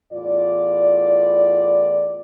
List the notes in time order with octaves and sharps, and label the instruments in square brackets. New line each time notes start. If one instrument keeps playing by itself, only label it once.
[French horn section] E2 A2 F4 D5